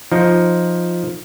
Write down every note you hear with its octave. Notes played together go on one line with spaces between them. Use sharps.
F3 D#4